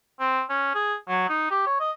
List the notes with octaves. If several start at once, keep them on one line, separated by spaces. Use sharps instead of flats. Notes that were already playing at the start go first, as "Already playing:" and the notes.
C4
C#4
G#4
F#3
D#4
G4
C#5
D#5